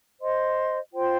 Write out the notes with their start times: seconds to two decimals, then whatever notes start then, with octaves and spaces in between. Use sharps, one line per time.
0.21 C5 D#5 C6
0.93 F4 C5 G5 C6